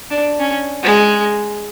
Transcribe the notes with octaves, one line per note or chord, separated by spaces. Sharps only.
D4
C#4
G#3